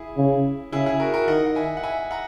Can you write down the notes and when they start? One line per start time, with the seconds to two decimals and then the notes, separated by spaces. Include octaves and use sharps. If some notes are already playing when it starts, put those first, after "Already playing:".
Already playing: E4 G#4
0.17 C#3
0.72 C#3 E4 G#4
0.86 E4 G#4
1.00 F#4 A#4
1.14 F#4 A#4
1.28 D#3 D#5 F#5
1.46 F#5
1.55 E5 G#5
1.77 F#5
1.83 E5 G#5
2.11 F#5 A#5